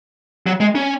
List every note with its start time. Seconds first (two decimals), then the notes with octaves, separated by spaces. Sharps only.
0.47 F#3
0.61 G#3
0.75 C#4